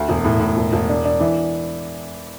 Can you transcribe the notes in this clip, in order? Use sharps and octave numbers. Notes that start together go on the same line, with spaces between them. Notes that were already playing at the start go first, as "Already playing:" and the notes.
Already playing: D2
E1
A2
A2
E1
E1
D4
D4
E3